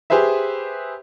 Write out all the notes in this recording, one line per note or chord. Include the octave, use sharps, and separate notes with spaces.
G4 G#4 B4 C5 E5